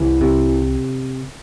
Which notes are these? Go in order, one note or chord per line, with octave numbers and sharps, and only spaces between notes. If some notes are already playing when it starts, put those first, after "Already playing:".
Already playing: C2 E3
C3